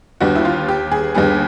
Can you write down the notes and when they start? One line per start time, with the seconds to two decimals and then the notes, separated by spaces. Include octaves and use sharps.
0.21 D#2 D3 G3 B3 F#4
0.36 E4
0.45 F4
0.68 G4
0.92 G#4
1.15 D#2 D3 G3 B3 G#4